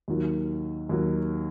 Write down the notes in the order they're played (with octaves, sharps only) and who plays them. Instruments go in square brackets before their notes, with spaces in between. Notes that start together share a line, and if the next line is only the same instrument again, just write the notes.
[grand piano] D#2 D#3 F#3
D#2 D#3 F#3